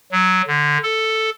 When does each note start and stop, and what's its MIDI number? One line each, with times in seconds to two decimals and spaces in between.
0.11 0.42 54
0.47 0.78 50
0.83 1.30 69